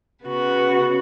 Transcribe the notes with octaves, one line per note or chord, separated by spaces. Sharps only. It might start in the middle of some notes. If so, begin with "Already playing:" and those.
C#3 B3 F#4